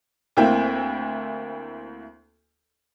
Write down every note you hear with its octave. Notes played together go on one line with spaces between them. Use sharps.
D2 A#3 C4 E4 G5